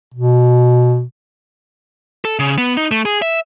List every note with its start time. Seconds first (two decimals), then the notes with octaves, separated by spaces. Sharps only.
0.14 B2
2.25 A4
2.39 C#3
2.58 B3
2.77 D#4
2.91 A3
3.05 G#4
3.22 E5